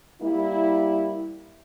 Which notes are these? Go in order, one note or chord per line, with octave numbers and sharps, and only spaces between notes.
G3 A#3 E4